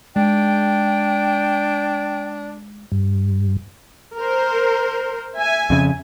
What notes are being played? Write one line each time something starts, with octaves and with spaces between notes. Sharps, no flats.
G#3 D4 G5
G2
A#4 C5
E5 G#5
F2 C#3